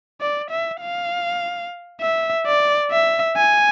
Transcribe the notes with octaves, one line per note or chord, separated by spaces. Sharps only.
D5
E5
F5
E5
D5
E5
G#5